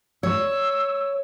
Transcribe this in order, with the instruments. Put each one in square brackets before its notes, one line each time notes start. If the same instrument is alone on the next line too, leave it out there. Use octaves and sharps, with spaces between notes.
[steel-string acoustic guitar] C#5 [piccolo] E6